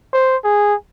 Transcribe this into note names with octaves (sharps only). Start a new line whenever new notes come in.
C5
G#4